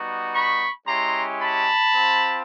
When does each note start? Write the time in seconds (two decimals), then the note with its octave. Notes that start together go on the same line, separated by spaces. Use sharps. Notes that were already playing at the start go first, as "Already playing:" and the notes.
Already playing: G3 B3 D#4 F#4
0.35 B5 C#6
0.87 G#3 C#4 E4 G4 A#5 C6
1.40 A5 B5
1.93 C4 F4